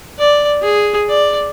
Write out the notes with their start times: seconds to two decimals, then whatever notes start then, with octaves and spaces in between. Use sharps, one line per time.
0.19 D5
0.62 G#4
1.09 D5